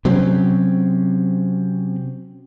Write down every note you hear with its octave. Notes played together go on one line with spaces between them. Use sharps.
C3 F#3 C4 C#4